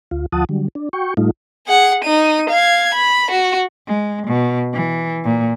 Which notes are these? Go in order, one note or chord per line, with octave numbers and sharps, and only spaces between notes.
D2 F4
D2 F3 F4 F#5 A5 D#6
D3 F#3 G3
D4
F#4 G5 C#6
A2 G3 A3 D#4 F4
G#4 F#5
D#4 D#7
F5 G#6
B5
F#4
G#3
B2
E3
A#2